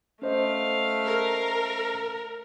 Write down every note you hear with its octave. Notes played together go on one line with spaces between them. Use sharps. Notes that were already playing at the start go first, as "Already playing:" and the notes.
A3 C#4 C5 D#5 F5
A#4